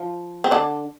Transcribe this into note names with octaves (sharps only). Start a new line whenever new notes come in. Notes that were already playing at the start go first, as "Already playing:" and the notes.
Already playing: F3 F4
C4
D3 D4